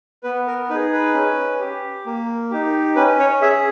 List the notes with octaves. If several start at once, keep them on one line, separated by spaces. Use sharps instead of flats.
B3 B4
A#4
D#4 G#4 B4
B4
C#4
G4
A#3
D#4 G4
C#4 B4
C#5
G#4 E5